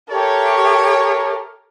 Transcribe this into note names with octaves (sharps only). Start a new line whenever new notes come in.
G4 A4 A#4 C#5 E5